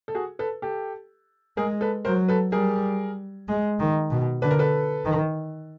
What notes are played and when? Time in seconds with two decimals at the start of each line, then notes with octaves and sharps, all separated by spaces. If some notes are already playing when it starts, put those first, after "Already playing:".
0.08 A4
0.15 F#4 G#4
0.39 A4 B4
0.62 G4 A4
1.57 G#3 G#4 A#4
1.81 A4 B4
2.05 F#3 A#4 C5
2.28 A4 B4
2.52 G3 G#4 A#4
3.48 G#3
3.80 D#3
4.11 B2
4.42 D3 B4
4.51 A#4
4.59 A4 B4
5.05 D#3